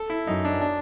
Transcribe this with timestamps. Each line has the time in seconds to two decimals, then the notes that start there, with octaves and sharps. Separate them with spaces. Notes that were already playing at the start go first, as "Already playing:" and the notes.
Already playing: A4
0.10 E4
0.27 F#2 D#4
0.45 D4
0.61 D4